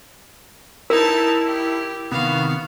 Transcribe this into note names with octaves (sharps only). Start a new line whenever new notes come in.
D#4 E4 A#4 A5
G4
C3 D#3 B3 F#4 F5